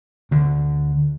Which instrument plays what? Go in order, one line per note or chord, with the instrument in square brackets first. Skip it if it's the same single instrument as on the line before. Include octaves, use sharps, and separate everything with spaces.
[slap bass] D2 D3